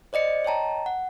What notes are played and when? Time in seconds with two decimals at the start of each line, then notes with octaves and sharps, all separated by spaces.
0.13 C5 D5 D#5 C#7
0.45 C#5 D#5 G5 A5 A#5
0.86 F#5